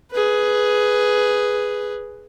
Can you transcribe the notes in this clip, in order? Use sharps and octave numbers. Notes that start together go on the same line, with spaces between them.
G#4 B4